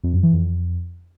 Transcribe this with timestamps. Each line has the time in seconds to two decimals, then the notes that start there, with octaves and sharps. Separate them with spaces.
0.04 F2
0.13 F#2
0.23 E3
0.33 F2